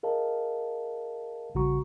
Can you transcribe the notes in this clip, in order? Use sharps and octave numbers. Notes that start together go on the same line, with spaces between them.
G#4 A#4 D#5 F5 A5
A#1 C#3 G3 F#4 A#5 C#6